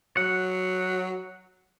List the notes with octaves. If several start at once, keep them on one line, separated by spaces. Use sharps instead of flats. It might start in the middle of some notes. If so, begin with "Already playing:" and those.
F#3 F#5